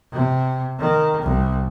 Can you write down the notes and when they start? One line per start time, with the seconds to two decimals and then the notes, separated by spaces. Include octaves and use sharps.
0.12 C3
0.78 D#3
1.22 C2